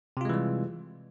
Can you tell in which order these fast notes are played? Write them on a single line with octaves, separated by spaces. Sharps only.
C3 F4 G#3 E3 G3